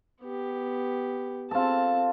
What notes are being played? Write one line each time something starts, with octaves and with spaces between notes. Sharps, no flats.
B3 G4
C4 F4 A4 A5